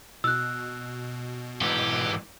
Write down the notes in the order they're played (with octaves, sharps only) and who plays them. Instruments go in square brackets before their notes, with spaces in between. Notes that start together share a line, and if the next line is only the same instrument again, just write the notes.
[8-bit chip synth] B2 [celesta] E6 F#6
[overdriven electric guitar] G#2 E3 [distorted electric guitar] G4